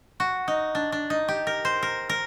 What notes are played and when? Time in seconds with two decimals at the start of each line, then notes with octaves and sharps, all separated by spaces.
0.20 F#4
0.48 D#4
0.75 D4
0.92 D4
1.10 D#4
1.28 G4
1.47 A#4
1.65 C5
1.83 A#4
2.09 A#4